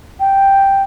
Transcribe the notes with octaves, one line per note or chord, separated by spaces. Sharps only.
G5